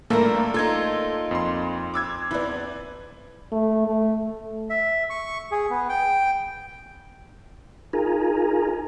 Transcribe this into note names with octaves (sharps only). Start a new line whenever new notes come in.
G2 A#2 E3 A3 A#3 A4 A#4
D#4 F4 A4 G#6
F2 C6
D6 E6 G#6
E2 E3 E4 B4 D5
A3
A3
E5
C#6
G#4
B3
G5
D#4 F4 G#4 A#4 G#5 A#5